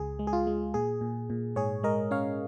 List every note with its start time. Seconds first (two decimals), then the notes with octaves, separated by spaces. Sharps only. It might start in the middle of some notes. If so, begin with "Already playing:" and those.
Already playing: C#2 G#4
0.19 G#3
0.27 G#4
0.33 F4
0.47 G#3
0.74 A#2 G#4
1.01 A#2
1.30 A#2
1.56 G#2 G#4 C#5
1.83 G#3 A#4 D#5
2.11 C#4 C#5 F5